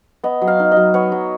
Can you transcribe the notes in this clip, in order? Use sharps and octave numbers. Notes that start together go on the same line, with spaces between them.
B3 D#5
F#3
F5
D#4
D#5
F#3
B3 C#5
F#3